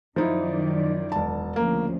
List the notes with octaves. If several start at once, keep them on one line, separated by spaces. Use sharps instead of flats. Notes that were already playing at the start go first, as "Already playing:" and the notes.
F#2 D#3 F3 D#4 E4 D5
E1 A5
D2 C#3 F3 A#3